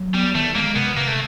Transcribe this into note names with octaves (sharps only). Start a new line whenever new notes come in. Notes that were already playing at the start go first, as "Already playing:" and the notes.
Already playing: F#3
G3 B3
D#3 A3
G#3 A#3
C3 B3
C3 A#3
A3